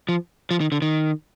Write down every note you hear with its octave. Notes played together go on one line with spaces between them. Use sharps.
F3
F3
D#3
D3
D#3